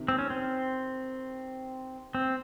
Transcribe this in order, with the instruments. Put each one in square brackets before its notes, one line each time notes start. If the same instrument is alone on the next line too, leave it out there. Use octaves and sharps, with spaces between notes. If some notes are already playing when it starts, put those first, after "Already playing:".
Already playing: [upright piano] C3 D#3
[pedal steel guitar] C4
C#4
C4
C4